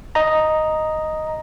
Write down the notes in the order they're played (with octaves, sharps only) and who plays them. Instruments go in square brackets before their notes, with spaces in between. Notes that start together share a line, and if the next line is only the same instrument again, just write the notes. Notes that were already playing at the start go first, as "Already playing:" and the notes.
[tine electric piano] D#5 A#5